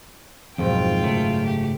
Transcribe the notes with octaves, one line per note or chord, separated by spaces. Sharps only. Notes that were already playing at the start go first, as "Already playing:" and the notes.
G#1 F2 G#2 B2 F#3 G#3 F4 G5
F#2 C#3 A3
G4